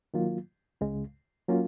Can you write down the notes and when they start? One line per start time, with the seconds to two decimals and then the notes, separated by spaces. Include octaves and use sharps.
0.14 D#3 F#3 A#3 F4
0.81 C#2 C#3 G#3
1.48 F#3 A#3 C#4 F4